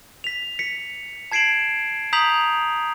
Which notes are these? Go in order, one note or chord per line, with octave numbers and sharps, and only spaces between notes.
B6 F7
B6 C#7
A5 G#6 C7 D7 E7 F#7
A#5 D#6 G6 B6 F7 F#7